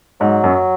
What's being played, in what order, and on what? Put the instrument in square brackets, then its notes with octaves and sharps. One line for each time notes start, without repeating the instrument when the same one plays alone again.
[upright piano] G#2 [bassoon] F#3
[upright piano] F#2